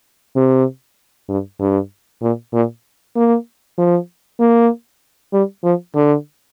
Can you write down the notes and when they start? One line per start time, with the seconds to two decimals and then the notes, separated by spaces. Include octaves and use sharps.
0.36 C3
1.29 G2
1.60 G2
2.22 A#2
2.53 A#2
3.16 A#3
3.78 F3
4.40 A#3
5.33 G3
5.64 F3
5.95 D3